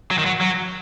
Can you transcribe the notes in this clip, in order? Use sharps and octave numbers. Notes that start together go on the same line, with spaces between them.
F#3
D#3
F#3
F#3